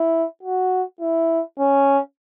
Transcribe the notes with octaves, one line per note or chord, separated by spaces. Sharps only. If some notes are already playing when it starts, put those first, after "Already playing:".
Already playing: E4
F#4
E4
C#4